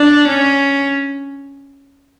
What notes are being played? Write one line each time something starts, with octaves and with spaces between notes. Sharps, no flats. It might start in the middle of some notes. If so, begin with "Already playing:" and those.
Already playing: D4
C#4